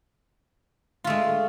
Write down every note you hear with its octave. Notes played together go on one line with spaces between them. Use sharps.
G#3 A3 F4